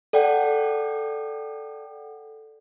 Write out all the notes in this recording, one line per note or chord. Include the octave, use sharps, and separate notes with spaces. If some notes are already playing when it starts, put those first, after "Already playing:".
A4 D5 F#5 G5